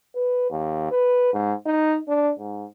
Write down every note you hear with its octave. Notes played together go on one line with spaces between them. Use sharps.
B4
D#2
B4
G#2
D#4
D4
G#2